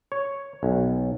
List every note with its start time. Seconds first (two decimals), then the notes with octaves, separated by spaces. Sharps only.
0.12 C#5
0.63 B1